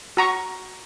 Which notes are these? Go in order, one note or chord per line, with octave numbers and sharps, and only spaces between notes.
F#4 A#5 C#6